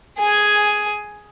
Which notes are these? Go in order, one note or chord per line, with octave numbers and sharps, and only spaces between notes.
G#4 G#5